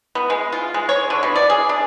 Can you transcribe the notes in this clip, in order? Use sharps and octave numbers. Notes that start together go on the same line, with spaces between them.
B3
G#3
F4
G#3
C#5
D3
B2
D5
G#4
D4